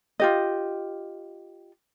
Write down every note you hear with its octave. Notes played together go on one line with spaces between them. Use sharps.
F4 G4 D#5